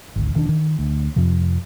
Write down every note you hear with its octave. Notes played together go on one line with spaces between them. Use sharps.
G#1 D2
E1 D#3 D4
D#3
D2
F2 C3 F3